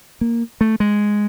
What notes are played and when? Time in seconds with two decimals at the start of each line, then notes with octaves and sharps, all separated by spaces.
0.21 A#3
0.61 A3
0.80 G#3